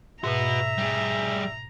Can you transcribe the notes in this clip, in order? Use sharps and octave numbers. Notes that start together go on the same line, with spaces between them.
G#2 B2 F#4 B4 E5 A#5
G3 G#4